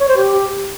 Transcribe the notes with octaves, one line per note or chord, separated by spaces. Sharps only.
C#5
C5
G4